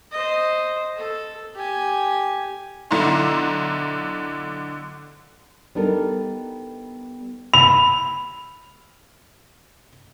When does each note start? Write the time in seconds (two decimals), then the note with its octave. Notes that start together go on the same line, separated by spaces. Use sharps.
0.12 C5 D#5
0.97 A4
1.56 G4 G#5
2.91 B1 D3 E4 A#5 C6
5.75 G3 B3 D4 D#4 A4 A#4
7.54 B5 F7